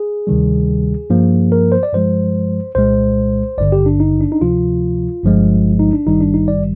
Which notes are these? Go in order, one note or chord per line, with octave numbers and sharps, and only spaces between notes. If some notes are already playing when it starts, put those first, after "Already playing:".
Already playing: G#4
D2 C3 D#3 G3
G2 F3 A#3
A#4
C5
D5
G2 F3 G#3 C5
C2 A#2 G#3 C5
G#1 G2 D3 D5
G4
D4
D#4
D4
D#4
D2 C3 F3 F4
G1 G2 F3 G#3
D#4
D4
G#1 G2 D#3 G3 D#4
D4
D#4
D5